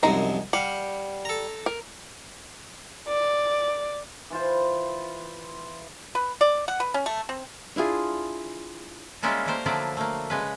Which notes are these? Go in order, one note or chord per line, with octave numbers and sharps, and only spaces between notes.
C2 F#2 F3 G#3 D#4 A#5
G3 F5 F#5
A4 A#5
A#4
D5
E3 F4 C5
B4
D5
F#5
B4
C#4
A3
C4
D4 E4 F4 G#4
G3 G#3 A#3 C#4 E4 F4
G3 A3 A#3 A#4 C5
D3 F3 F#3 E4 D5
A3 A#3
C#3 G#3 B4